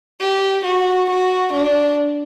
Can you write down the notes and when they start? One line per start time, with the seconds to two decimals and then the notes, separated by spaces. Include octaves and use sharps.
0.21 G4
0.64 F#4
1.10 F#4
1.53 D4